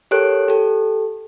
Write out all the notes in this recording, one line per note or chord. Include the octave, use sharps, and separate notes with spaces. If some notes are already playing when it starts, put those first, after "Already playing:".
G4 A4 A#4 C#5 F#6 D7
G4 A4